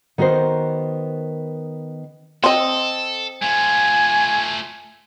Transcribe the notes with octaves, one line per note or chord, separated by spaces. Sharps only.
D#3 B3 F#4 A#4 C5
C4 A4 D#5
A3 F4 G#5